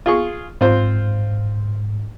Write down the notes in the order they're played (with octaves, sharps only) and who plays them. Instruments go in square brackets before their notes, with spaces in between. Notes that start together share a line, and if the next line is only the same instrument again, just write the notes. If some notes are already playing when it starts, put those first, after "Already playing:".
[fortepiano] F4 G#4 C#6
[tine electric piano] G#2 [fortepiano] C4 F4 C5